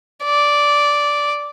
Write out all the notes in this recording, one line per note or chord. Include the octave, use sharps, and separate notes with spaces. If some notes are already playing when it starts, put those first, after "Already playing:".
D5